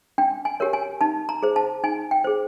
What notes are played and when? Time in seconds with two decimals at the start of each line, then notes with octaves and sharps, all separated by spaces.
0.18 D4 G5
0.45 G#5
0.60 G4 A#4 C#5
0.73 G#5
1.01 D#4 A5
1.29 A#5
1.43 G#4 C5
1.56 A5
1.84 D#4 G#5
2.11 G5
2.24 G#4 C5